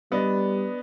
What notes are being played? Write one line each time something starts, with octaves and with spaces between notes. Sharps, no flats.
G3 B3 D4 D#5